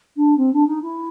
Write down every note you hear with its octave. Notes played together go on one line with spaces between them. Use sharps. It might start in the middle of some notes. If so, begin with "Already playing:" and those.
D4
C4
D4
D#4
E4